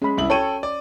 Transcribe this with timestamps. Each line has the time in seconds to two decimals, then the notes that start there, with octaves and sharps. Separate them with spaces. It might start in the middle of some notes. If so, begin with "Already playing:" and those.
0.02 G#3 C#4 B5
0.18 C2 E4 F#7
0.30 A4 C#5 G5 D#7
0.63 D5